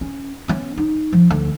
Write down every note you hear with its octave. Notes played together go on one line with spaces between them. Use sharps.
C#4
B3 C#4
D#4
F3
D2